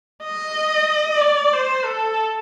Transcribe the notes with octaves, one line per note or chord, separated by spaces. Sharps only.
D#5
D5
C5
A4